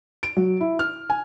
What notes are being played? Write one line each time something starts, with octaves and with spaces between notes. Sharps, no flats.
D7
F#3
E4
F6
G#5